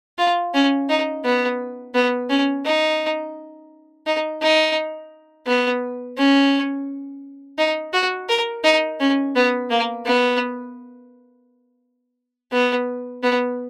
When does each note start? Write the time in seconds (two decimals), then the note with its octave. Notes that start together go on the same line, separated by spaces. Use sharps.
0.18 F4
0.54 C#4
0.89 D#4
1.24 B3
1.95 B3
2.29 C#4
2.65 D#4
4.06 D#4
4.42 D#4
5.47 B3
6.17 C#4
7.58 D#4
7.93 F#4
8.29 A#4
8.64 D#4
9.00 C#4
9.35 B3
9.70 A#3
10.06 B3
12.52 B3
13.23 B3